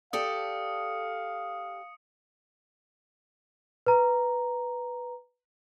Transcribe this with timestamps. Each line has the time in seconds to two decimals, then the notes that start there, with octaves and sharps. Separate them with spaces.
0.13 G4 A4 D5 F5 D#6 C#7
3.87 B4 A#5